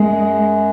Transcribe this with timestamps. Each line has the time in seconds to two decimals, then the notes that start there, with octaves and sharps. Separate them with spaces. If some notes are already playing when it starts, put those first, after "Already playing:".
Already playing: F#2 G#3